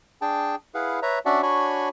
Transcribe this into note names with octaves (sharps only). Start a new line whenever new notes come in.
D4 G#4 G5 A5
E4 G#4 B4 F5 F#5
B4 C#5 E5 A#5
C#4 D4 F#4 D5 E5 F#5
D4 F#4 C#5 G#5 B5 C#6